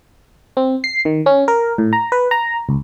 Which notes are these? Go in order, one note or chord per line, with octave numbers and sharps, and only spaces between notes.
C4
C7
D#3
C#4
A#4
A2
A#5
B4
A#5
C#2